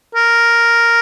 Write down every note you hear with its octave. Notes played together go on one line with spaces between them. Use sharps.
A#4